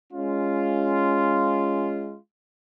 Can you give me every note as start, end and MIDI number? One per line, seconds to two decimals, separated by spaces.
0.13 2.16 56
0.13 2.16 61
0.13 2.16 65